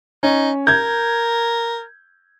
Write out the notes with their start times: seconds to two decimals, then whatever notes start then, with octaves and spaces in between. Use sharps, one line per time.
0.23 C#4 D#4
0.67 A#4 G6 G#6